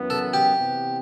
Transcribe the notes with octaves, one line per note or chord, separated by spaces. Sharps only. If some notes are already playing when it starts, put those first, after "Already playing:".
Already playing: F#2 E3 B3
A4
G4
C3 E3 B3